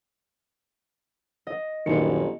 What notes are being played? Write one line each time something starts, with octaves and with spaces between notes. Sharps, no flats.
D#5
G1 F#2 A#2 D#3 C#7